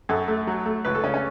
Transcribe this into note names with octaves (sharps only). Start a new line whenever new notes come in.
F#2 A4
A3
F#3
A3
C#2 B4
A4
C#3 C#4
C#4